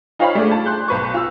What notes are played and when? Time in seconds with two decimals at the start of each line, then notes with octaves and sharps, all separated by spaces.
0.19 D#4 F4 C5 C#5 F5 B5
0.35 A3 D4 G#4 D5
0.51 A5
0.66 C6 F#6 G6
0.88 B1 B4 C#6
1.14 F4 E6